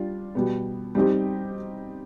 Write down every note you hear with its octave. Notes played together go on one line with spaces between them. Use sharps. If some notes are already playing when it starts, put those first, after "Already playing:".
Already playing: G3 D4 F4
B2 G3 B3
G3 C4 D#4 G4